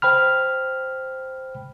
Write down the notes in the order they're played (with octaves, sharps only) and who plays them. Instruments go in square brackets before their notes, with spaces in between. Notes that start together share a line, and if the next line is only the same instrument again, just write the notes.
[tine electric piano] C5 G5 B5 F6